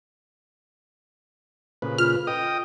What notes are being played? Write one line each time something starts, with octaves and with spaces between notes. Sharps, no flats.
A#2 C#3 A4 B4 C5
F4 F6
A4 D#5 G5 D#6